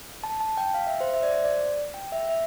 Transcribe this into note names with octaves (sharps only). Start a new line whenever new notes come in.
A5
A5
G5
F5
E5
C5
E5
D5
C5
D5
G5
E5
E5